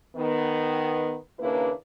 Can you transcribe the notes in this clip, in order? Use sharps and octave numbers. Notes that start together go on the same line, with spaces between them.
D#3 B3
D#2 C#3 A#3 D4 E4 B4